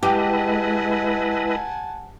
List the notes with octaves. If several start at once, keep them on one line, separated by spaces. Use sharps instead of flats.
G#3 E4 G4 B4 D#5 F#5 G#5 A5